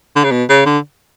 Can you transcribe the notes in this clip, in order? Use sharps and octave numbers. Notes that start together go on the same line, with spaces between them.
D3
C#3
B2
C#3
D3